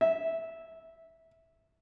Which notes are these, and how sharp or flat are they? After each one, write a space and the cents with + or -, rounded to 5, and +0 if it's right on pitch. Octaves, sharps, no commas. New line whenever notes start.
E5 -10